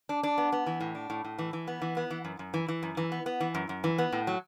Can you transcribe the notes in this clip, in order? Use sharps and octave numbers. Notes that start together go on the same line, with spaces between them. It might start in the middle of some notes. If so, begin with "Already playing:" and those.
D4
D4
B3
B3
E3
A2
D4
A2
A2
E3
E3
B3
E3
B3
E3
F#2
F#2
E3
E3
F#2
E3
B3
B3
E3
F#2
F#2
E3
B3
A2
F#3